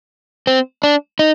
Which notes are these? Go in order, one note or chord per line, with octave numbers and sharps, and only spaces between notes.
C4
D4
D#4